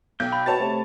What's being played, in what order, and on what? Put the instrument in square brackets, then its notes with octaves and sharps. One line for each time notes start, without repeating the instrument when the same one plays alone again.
[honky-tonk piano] B1 [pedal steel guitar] G5 G6
[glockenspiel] B5
[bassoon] B2 [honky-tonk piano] C#5 A5 A6
[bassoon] C3 [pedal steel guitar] A3